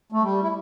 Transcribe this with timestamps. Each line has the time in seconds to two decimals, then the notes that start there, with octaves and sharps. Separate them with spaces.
0.12 A3
0.22 G3
0.43 E4